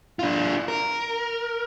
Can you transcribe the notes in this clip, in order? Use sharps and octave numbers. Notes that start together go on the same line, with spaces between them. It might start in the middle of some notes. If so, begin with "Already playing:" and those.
D4 F4
A#4